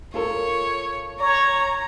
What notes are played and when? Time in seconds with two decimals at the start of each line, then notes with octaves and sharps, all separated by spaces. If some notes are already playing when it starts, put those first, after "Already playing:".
0.14 F4 A4 A#4 C#5
1.20 C#5 A#5